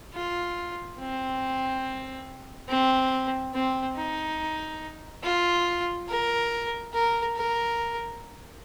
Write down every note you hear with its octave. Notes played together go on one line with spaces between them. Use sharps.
F4
C4
C4
C4
D#4
F4
A#4
A#4
A#4